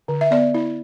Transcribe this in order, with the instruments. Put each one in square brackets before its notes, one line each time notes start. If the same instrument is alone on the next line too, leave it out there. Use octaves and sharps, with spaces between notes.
[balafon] D3
E5
B3 D5
E4